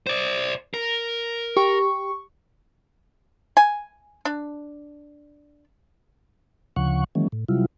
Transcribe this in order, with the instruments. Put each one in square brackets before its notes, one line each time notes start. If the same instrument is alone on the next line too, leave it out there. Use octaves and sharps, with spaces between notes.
[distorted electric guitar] C5 D5
A#4
[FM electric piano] G4 [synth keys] C#6
[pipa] G#5
D4
[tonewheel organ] D2 C#3 F3 F#5 C#6
D#3 E3 F#3 G#3 A#3 C#4
A2
C3 F#3 G3 E4 F4